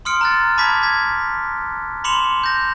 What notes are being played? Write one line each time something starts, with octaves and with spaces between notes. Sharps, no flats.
C6 D#6 F6 C#7 D7
A#5 F#6 A6
A5 B5 D6 G#6 B6
G#6 B6
B5 C6 D6 C#7 E7 F7
G6 A#6